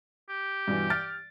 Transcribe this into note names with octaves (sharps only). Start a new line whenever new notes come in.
G4
G2 B2 E3
F6 A6 D7